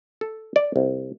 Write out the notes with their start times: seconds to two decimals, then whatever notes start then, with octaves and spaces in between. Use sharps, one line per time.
0.21 A4
0.56 D5
0.76 C2